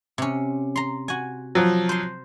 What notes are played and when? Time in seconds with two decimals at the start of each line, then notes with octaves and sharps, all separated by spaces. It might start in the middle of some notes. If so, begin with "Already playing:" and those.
0.18 C3 C#4
0.76 A#5 C6
1.08 F#4 G#5
1.55 F3 F#3
1.89 C5 C6